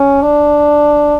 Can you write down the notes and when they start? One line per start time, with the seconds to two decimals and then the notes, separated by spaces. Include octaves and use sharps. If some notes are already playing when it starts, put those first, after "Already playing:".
Already playing: C#4
0.22 D4